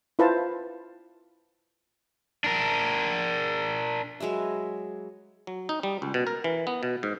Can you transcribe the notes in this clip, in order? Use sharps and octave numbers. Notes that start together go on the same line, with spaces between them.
E4 F4 B4 C5 F5 A5
D4 A#4
F#3 G#3 B4 E5
F#3
D#4
G3
C#2
B2
A#4
E3
B3
B2
G#2